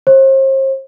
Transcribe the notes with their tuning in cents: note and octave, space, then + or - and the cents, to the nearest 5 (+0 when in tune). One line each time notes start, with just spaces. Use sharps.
C5 +40